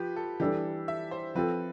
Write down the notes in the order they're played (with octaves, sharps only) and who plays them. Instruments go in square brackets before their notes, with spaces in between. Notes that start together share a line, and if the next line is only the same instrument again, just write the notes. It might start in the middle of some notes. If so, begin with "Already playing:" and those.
Already playing: [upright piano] F3 [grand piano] G4 B4
[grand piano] A4
[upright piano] E3 G3 D4 A4 [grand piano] G4
[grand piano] E5
C5
[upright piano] F3 C4 F4 A4 [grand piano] B4